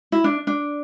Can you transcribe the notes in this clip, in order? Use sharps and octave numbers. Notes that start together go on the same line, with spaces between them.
E4
D4
D4